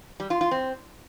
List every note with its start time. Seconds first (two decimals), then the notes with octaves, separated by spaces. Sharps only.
0.20 G3
0.30 F4
0.41 F4
0.51 C4